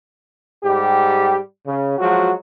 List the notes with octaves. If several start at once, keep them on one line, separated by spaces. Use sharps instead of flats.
G#2 G3 G4
C#3
F3 F#3 G#3 F#4